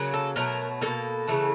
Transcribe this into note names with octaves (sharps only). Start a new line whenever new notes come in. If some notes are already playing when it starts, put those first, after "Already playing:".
Already playing: C#3 F#3 A#3
A4
B2 F#3 A3 A#4
B2 F#3 A#3 A4
C#3 E3 A3